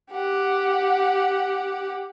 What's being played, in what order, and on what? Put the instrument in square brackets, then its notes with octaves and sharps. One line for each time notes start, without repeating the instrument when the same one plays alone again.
[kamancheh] G4 F#5